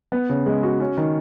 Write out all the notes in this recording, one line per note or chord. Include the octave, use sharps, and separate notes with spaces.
B3
C#3
G#3
F#4
C#4
D#3